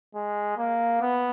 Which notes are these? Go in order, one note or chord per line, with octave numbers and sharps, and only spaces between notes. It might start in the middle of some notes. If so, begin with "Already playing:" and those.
G#3
A#3
B3